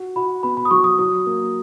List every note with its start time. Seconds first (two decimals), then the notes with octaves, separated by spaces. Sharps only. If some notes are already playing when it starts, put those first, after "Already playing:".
Already playing: F#4
0.16 F#4 B5
0.43 B3 B5
0.57 B5
0.65 D#6
0.71 F#3 C#6
0.84 D#6
0.99 F#3 D#6
1.26 A#3